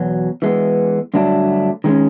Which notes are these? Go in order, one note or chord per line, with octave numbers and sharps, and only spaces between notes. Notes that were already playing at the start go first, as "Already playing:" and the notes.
Already playing: E2 B2 F#3
E3 G#3 B3
G2 D3 F#3 A3 D4
D#3 G#3 C#4